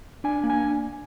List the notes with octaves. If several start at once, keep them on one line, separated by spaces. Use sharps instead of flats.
D4 G#5
A#3
G#5